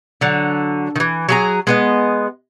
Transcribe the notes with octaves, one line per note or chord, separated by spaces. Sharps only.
D3 F#3
D#3 E3
F#3 G#4 A#5
G#3 B3 D#5